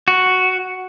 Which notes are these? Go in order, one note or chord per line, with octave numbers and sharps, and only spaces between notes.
F#4